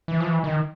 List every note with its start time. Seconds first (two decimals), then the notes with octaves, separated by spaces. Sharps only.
0.08 E3
0.20 F3
0.27 E3
0.44 D#3